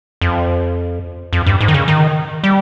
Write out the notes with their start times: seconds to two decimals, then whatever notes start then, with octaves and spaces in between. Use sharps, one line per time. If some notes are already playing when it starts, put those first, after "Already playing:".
0.21 F2
1.33 F2
1.46 G2
1.61 G#2
1.68 D#3
1.74 C#3
1.88 D#3
2.44 G3